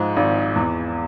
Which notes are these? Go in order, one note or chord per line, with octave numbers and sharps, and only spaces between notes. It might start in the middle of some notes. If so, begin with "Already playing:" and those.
Already playing: G#2 F3 G#3
G#1
E2